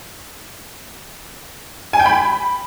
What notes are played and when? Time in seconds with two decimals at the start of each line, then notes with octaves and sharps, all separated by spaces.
1.93 G#5
2.00 G5
2.06 B5